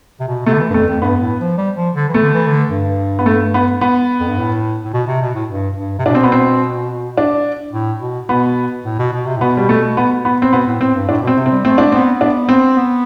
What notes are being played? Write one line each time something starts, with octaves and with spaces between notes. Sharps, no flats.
C3
B2
C3 A3
D3
E3
G2
F2 A3
F2
G2 B3
A2
F3
G3
F3
D3
E3
A3
D3
E3
D3
G2
B3
A3
B3
B3
F2
G2
A2
A2
B2
C3
B2
A2
G2
G2
C3
B2 D4
C4
B3
C4
D4
A2
B2
B2 B3
A2
B2
B2
C3
A2
B2 B3
G3
A3
B3
B3
C4
B2 B3
A2
A2 C4
G2
A2 D4
B2
C4
C3
C4
G3
A3 C4
D4
B3 C4
B3 D4
C4
B3